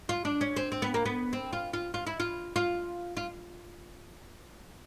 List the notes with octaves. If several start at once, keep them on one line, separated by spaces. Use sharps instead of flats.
F4
D4
C#4
C4
C4
B3
A#3
B3
C4
F4
F4
F4
E4
F4
F4
F4